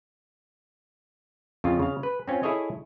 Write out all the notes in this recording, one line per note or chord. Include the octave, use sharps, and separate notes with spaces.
F2 C#3 F4
C#3 F5
B4
C4 C#4 F4
E4 G#4 A4 C#5 D#5